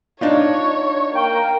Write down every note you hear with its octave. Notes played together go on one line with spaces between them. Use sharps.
D4 D#4 F4 C#5
A#3 G5